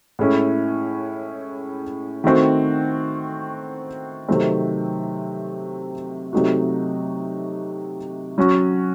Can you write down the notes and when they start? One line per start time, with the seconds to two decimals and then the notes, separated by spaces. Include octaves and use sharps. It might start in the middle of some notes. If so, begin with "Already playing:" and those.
0.19 A2 G#3 C#4 E4
2.24 D#3 A3 C4 F#4
4.29 C3 D#3 F#3 A3 C4
6.33 C3 F#3 A3 D#4 F#4
8.38 F#3 C#4 F#4